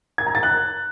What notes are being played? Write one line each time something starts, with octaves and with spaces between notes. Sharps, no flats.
G#6
A#5
A6
F#6